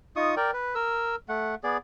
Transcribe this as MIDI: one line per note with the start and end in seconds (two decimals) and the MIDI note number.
0.16 0.35 63
0.16 0.35 65
0.16 0.35 85
0.16 0.35 87
0.37 0.51 70
0.37 0.51 74
0.37 0.51 79
0.53 0.75 71
0.75 1.16 70
0.75 1.16 88
1.29 1.55 57
1.29 1.55 78
1.64 1.77 59
1.64 1.77 68
1.64 1.77 74